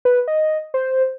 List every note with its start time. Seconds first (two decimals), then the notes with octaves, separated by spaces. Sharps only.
0.05 B4
0.28 D#5
0.74 C5